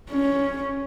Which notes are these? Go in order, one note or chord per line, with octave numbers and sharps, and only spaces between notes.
C#4